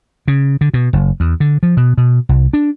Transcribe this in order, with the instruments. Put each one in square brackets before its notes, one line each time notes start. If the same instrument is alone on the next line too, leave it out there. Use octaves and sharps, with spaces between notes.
[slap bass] C#3
D3
B2
F#1
E2
D3
F3
B2
B2
C2
D4